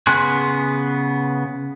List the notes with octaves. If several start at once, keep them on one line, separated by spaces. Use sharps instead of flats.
C#3 B3 G#5 C6 F#6